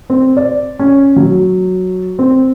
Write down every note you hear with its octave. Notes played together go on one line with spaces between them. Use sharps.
C4
D5
C#4
F#3
C4